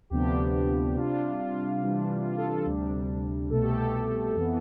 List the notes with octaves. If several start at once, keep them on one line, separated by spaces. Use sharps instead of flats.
D2 C3 F3 B3 D4 G4
C3 G3 D4 F4
F4
C3 E3 G3 D4
F4
A4
A4
D2 C3 G3 D4
C2 B2 A3 A4
G4
A4
F2 E3 B3